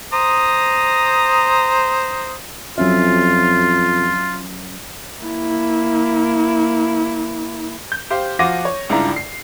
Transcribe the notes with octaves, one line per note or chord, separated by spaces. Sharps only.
C5 A#5 D#6
F2 F#3 C#4 F4 E5
A#3 E4
G6
G4 C5 F5
F3 F4 F#4 D6 A#6 D#7
C#5
C#2 G2 D4 E4 F4 A#5
C7